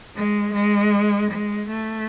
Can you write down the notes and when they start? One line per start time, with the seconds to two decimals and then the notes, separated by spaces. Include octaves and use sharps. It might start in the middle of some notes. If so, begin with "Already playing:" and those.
0.15 G#3
0.53 G#3
1.31 G#3
1.69 A3